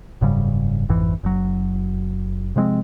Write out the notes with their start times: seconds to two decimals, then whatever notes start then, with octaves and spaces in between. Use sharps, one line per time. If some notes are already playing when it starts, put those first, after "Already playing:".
0.21 F#1 G#2 C#3 G3
0.89 G#1 F2 G#2 E3
1.23 F#1 F#3
2.56 C3 F3 G#3 C4